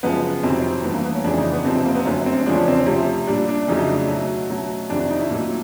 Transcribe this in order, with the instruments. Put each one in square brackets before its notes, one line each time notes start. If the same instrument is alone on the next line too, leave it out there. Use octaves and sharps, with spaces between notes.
[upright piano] F#2 C#3 F3 G#3 B3
F2 C3 D#3 F#3 C4
G2 E3 A3 B3
A#3
B3
C#4
F2 C#3 E3 G#3 D4
D#4
B3
F2 C3 F3 C4
C4
A#3
B3
F#2 D3 F#3 A3 C#4
C4
E2 C#3 F3 G#3 D4
C#4
C4
C#4
C3 F3 A3
A#2 G3 D4
D4
F2 C#3 F#3 A3 D#4
D#4
D4
B2 F#3 A3
B2 F#3 A3
F2 C3 D#3 D4
D4
D#4
E4
A#2 F#3 A3